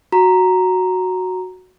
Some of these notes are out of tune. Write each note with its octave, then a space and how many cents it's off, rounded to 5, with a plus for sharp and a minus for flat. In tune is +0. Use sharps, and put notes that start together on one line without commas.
F#4 -5 A#5 +0